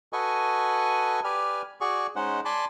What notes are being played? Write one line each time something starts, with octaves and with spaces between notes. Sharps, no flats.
F#4 A4 B4 D#5 G#5 C#6
G4 B4 D5 G#5 F6
F#4 G#4 D5 C#6
G#3 C#4 D#4 C5 F#5
D5 G#5 A5 B5 C6 D6